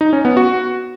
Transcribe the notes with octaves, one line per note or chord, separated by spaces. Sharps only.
D#4
C#4
B3
F#4